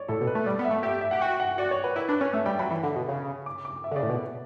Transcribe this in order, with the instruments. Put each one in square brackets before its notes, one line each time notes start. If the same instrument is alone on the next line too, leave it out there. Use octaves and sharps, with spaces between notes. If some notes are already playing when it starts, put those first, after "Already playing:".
Already playing: [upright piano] C#5 D5
[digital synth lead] A2 [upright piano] A4
[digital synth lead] B2
[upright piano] B4
[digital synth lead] A3
[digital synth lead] G3 [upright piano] D5
[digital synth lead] B3
[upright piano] E5
[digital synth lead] A3
[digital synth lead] G4 [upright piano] E5
[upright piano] E5
[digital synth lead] G4 [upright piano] F#5
[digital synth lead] F#4 [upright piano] G5
[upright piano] F#5
[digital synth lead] F#4 [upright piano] D5
[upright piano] C#5
B4
[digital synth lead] E4 [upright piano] B4
[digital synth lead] D4 [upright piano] B4
[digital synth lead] C#4 [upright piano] C#5
[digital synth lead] A3 [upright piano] E5
[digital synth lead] G3 [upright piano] G5
[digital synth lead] F#3 [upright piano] B5
[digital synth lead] E3
D3
B2
C#3
[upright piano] D6
D6
E5
[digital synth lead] D3
[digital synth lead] C#3 [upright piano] D5
[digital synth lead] A2
[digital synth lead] B2 [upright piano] B4